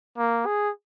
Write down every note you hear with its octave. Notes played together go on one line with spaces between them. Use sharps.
A#3
G#4